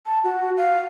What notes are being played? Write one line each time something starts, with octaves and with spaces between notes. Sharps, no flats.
A5
F#4
F5